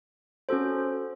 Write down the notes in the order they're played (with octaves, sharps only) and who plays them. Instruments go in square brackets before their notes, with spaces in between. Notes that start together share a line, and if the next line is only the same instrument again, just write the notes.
[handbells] C#4 F#4 A4 C5